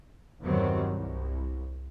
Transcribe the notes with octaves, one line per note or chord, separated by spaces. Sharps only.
E2 G2 D#3 F#3 G3 C4
C2